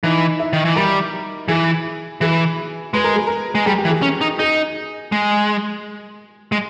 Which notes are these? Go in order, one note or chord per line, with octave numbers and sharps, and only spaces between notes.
E3 D#4
E4
D#3
E3
G3 A#4
E3 G#4
E3 G#4
G#3 B4
A#4
G#4
A#4
G#3
G3 G#4
G4
E3
G#4
C#4
D#4
D#4 G#4
G#3
G#3